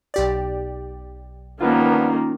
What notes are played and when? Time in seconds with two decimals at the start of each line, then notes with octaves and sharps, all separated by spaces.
0.14 B1 G4 D5
1.61 G2 D#3 F3 A#3 B3 C#4 D#4 F4